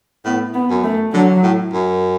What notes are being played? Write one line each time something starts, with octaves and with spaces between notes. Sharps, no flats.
A2 B3
B3
F#2
A3
D3 F#3
A2
F#2